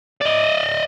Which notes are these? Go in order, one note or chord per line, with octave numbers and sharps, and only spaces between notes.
D5 D#5